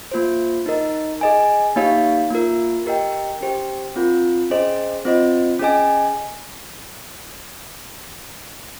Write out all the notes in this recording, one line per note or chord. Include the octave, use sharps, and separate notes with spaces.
A#3 F4 C5
D#4 A#4 D#5
G#4 D#5 G#5
A#3 D#4 G4 C#5 F5
A#3 F4 A#4
G4 A#4 D#5 G5
C#4 G4 C5 G5
C4 F4 A#4
C#4 G#4 C5 D#5
C4 F4 C5 D#5
C#4 G#4 D#5 G#5